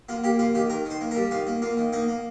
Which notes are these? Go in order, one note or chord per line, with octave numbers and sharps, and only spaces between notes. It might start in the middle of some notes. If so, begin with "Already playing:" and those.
A#3 F4
A#3 G4
A#3 F4
D#3 G4
D#3 A#4
D#3 C5
A#3
A#4
G3
D#3 F4
A#3
A#3 F4
D#3
A#3 D#4
A#3